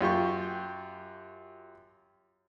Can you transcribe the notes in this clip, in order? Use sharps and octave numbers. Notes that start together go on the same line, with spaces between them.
F#2 F4 G4 C#6